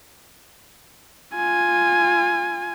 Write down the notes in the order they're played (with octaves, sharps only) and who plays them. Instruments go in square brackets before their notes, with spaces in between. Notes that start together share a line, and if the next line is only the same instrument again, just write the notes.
[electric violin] F4 G#5